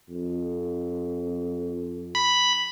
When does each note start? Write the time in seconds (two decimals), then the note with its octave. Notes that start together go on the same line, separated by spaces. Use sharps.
0.10 F2
2.15 B5